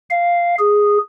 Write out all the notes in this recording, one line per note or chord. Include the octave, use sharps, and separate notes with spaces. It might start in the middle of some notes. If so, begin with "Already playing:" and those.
F5
G#4